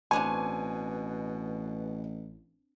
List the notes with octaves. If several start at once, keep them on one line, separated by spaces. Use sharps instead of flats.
A1 B2 C4 D4 C#5 G#5